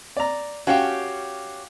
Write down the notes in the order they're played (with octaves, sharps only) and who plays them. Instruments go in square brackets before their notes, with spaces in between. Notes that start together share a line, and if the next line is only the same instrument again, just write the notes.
[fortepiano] D5 A#5
[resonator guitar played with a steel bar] C#4 G4 [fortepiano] F#4 F5 G5